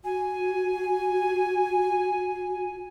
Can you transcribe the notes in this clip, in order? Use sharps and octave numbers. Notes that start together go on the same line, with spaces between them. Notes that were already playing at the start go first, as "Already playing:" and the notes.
F#4 G#5